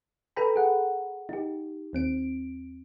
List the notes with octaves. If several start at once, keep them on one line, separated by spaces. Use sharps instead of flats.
A4 B4 G5 A#5 B5
G#4 F#5
D#4 G4
D#2 C4 D7